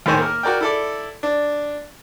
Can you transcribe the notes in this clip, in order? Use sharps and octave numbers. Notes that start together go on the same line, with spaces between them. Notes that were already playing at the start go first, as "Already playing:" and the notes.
D#2 A2 D#3 C5 C#5 G#5
A#3 A#4
F#4 A#4 D5 G5
E4 A4 D5
D4